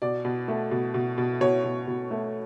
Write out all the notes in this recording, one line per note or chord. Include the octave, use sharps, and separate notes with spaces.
B2 D5
B2
A3
B2
B2
B2
B2 C#5
B2
B2
A3